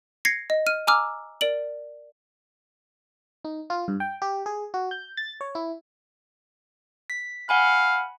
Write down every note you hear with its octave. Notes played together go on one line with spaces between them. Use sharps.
G#6 A#6 C7 C#7
D#5
F6 D#7
G#5 A#5 D6 E6 F6
A#4 D5 D7 F#7
D#4
F4
G2
G5
G4
G#4
F#4
G6
A6
C#5
E4
B6
F5 F#5 G#5 B5